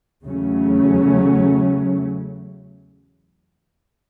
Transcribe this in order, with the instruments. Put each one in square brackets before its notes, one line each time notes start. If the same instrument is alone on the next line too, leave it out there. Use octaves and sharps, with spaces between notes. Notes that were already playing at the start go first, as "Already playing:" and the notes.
[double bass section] E2 C#3 F#3 A3 C#4